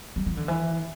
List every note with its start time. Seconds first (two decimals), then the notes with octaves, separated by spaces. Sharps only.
0.16 G3
0.26 E3
0.37 D3
0.48 E3